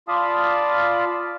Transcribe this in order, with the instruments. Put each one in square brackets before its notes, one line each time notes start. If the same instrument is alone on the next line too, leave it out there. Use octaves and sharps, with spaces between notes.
[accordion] F4 D5 F5 A5 B5 D#6